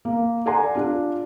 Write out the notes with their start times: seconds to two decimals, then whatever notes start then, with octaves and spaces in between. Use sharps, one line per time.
0.05 A#3
0.46 A4 D5 F#5 G#5 A#5 C6
0.75 D4 F4